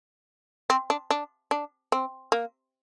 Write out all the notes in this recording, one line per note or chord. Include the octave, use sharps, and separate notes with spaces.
C4
D4
D4
D4
C4
A#3